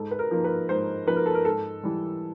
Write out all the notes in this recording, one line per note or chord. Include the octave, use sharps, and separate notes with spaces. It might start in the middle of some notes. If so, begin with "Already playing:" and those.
Already playing: G#2 A4
B4
A#4
F3 A#3 D#4
B4
G#2 C5
F3 A#3 D#4 B4
A#4
A4
A#4
G#2 A4
E3 G3